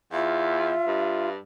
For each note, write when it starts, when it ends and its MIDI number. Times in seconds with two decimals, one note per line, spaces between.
0.13 0.72 40
0.13 1.28 65
0.13 1.29 76
0.87 1.38 43